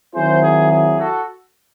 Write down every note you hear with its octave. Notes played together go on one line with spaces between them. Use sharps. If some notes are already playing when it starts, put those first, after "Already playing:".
D#3 F#3 C4 E4 G#4 C5
G#4
G#4
F#4 A4